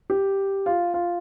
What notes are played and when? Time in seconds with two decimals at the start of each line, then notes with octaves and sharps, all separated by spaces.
0.10 G4
0.66 F4
0.94 F4